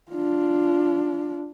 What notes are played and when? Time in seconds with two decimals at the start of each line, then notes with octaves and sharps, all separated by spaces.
0.12 D4 F4